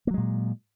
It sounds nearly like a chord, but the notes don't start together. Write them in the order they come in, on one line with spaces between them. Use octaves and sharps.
A#3 F#3 G#3 A#2